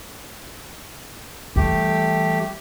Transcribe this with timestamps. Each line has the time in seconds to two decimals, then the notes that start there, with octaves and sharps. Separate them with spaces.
1.56 E3 G3 A3 G4